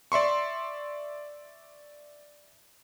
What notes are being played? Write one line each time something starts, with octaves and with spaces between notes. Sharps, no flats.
D5 E5 C6 C#6